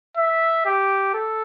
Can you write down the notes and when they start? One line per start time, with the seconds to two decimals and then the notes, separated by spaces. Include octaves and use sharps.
0.17 E5
0.66 G4
1.14 A4